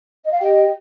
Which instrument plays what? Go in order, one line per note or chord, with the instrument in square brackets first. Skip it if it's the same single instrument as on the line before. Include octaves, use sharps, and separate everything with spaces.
[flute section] D#5
F5
[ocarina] G4 [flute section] D#5 G5